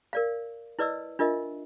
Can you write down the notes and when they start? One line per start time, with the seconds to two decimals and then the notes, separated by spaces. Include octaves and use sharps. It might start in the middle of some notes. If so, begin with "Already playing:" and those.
0.13 A#4 D5 F5
0.79 E4 B4 D5 D#5 E6
1.19 D4 F4 A#4 D#5 E5